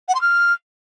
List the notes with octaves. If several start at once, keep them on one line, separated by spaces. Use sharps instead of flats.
F#5
C6
F6